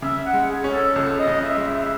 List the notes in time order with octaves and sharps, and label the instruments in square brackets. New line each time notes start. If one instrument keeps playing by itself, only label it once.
[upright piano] C#3 [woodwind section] E5
[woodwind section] F#5
[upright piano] G#3
[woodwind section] G#4
[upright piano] C#4
[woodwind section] A4
[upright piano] C#2 [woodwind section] A4
[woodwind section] D#5
[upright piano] C#3
[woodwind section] E5
[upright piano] G#3
[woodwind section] E5